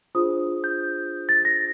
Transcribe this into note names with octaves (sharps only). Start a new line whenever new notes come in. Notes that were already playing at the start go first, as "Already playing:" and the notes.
D4 F4 G#4 C5 D#6
G6
A6
A#6